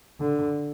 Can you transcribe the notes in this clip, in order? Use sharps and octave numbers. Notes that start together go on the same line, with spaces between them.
D3